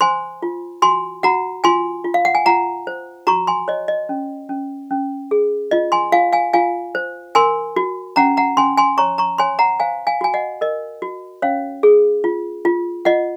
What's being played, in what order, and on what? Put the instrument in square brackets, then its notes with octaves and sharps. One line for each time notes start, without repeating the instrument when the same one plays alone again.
[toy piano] C5 G#5 C6
F4
F#4 G#5 C6
F#4 F#5 A#5
F4 G#5 C6
F4
F5
F#5
G#5
F4 F#5 A#5
C5
F#4 A#5 C#6
G#5 C6
C#5 D#5
D#5
C#4
C#4
C#4
G#4
F4 D#5
G#5 C6
F4 F5 G#5
F5 G#5
F4 F5 G#5
C5
A#4 G#5 C6
F#4
C#4 F#5 A#5
F#5 A#5
C#4 G#5 C6
G#5 C6
C#5 A#5 C#6
A#5 C#6
C#5 G#5 C6
F#5 A#5
C5 F5 G#5
F5 G#5
F#4 G#5
D#5 F#5
A#4 D#5
F#4
C#4 C#5 F5
G#4
F4
F4
F4 D#5 F#5